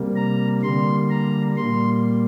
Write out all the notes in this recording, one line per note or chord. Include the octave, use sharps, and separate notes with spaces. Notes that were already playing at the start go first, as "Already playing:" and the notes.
Already playing: C3 G3 A#3
A#5
D3 G3 A#3 C6
A#5
A#2 G3 A#3 C6